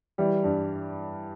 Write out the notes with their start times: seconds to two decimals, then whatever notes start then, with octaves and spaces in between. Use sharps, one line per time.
0.18 E3 G3
0.44 G2